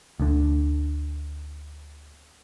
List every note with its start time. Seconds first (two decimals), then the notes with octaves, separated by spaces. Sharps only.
0.20 D2 D3